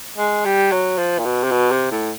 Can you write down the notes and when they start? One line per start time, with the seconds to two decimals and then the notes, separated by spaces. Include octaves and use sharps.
0.18 G#3
0.45 G3
0.72 F#3
0.98 F3
1.18 A#2
1.25 B2
1.43 C3
1.51 B2
1.71 C3
1.91 A2